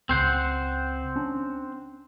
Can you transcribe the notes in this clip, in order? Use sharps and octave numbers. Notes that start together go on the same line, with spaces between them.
C#2 C#3 C4 C5 F#5
C#4 D4